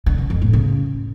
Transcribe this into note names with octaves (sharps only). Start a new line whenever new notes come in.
D3
C#3
F2
A2
C#3